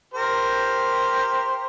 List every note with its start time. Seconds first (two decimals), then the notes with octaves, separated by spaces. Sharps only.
0.14 G4 A#4 C5